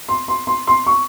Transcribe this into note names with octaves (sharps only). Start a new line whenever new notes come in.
C6
C6
C6
C6
C#6